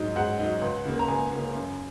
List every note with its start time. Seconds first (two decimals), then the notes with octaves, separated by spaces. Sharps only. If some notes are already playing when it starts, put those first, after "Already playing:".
Already playing: G#2 F#3 D#4
0.16 G#2 F#5
0.39 F#3 D#4
0.61 C#2
0.85 C#3 A#3
0.99 A#5
1.08 C#2 G#5
1.31 C#3 A#3
1.55 F#2